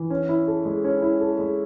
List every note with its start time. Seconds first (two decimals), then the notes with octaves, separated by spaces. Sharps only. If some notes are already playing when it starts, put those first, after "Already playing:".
Already playing: E3
0.10 C#4
0.29 E4
0.47 A4
0.65 G#3
0.84 C#4
1.02 E4
1.20 A4
1.39 G#3